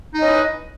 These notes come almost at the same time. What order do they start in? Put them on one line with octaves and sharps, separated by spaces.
D#4 D#5 C#4 E4 B4